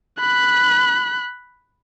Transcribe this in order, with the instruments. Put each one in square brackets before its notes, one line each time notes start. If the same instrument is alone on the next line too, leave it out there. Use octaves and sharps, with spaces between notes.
[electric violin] B5 F#6